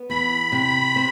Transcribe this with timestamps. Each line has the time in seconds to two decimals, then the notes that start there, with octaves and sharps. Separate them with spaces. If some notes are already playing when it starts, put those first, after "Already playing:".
Already playing: B3
0.10 E2 B5
0.52 C3
0.96 C4